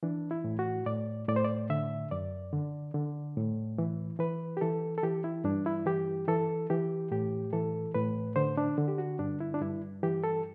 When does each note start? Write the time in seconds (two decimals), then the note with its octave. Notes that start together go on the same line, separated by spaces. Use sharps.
0.03 E3 D4
0.31 E4
0.44 A2
0.59 F#4
0.86 A2 D5
1.28 A2 D5
1.36 C5
1.45 D5
1.70 D3 E5
2.11 F#2 D5
2.53 D3
2.94 D3
3.37 A2
3.78 E3
4.19 E3 B4
4.57 G4
4.61 E3 A4
4.98 A4
5.03 E3 G4
5.24 E4
5.44 G2 D4
5.66 E4
5.86 E3 G4
6.28 E3 A4
6.70 E3 G4
7.11 A2 G4
7.53 E3 A4
7.94 A2 B4
8.36 D3 C5
8.57 D4
8.78 D3
8.88 G4
8.98 F#4
9.19 G2 D4
9.40 E4
9.54 D4
9.62 G2 E4
10.03 E3 G4
10.24 A4